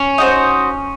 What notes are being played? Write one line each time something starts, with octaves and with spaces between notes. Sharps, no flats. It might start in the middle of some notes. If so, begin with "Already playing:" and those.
Already playing: C#4
D#4 F#4 C5